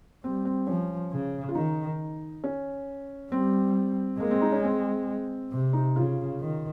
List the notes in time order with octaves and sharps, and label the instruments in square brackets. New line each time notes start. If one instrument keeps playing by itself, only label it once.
[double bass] G3 [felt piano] C4
[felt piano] C4
[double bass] F3 [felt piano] C#4
[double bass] C#3
[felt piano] F4
[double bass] D#3 [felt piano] D#4
[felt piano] C#4
[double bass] G3 [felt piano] C4
[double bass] G#3 [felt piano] A#3
[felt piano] C4
D#4
C#4
C4
[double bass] C3
[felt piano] D#4
[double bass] C#3 [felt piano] F4
[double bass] D#3